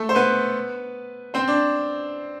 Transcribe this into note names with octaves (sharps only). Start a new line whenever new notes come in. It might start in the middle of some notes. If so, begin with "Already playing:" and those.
Already playing: A3 A4
C5
B3 B4
C4 C5
D4 D5